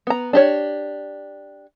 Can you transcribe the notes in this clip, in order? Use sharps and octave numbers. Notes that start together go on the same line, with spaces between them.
B3 A#5
D4 G4 C#5